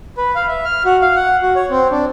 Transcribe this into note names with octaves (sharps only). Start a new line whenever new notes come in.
B4
F5
E5
F6
F#4
F5
F#5
F#4
C#5
C4
D4